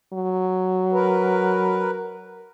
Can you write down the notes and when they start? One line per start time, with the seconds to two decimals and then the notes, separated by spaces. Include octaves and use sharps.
0.13 F#3
0.93 A#4 B4